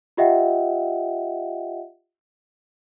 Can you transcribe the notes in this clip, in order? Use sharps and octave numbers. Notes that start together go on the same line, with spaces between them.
F4 G4 D#5 E5 F#5 G5